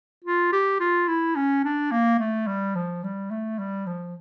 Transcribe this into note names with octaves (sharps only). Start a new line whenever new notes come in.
F4
G4
F4
E4
C#4
D4
A#3
A3
G3
F3
G3
A3
G3
F3